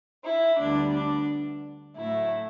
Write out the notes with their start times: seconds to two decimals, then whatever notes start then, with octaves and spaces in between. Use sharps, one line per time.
0.24 E4
0.59 D2 D3 G3 B3 D4
0.94 D4
1.97 A2 F#3 A3 E4